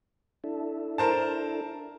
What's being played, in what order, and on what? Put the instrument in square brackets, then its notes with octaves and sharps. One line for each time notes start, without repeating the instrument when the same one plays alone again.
[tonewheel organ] D4 E4 A4
[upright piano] A#4 C5 A5